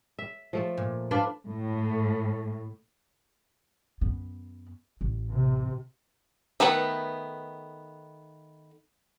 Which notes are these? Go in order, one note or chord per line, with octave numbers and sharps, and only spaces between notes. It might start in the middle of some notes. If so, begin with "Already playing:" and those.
E5
F3 A3 A4
A#2
D4 F4 B4
A2
F#2 B3
A1
C3
D#3 A3 B3 B4